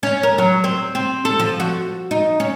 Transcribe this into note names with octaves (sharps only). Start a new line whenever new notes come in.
C#4
A#4
F#3
C4
C4
A4
F3
F#4
D#4
C#4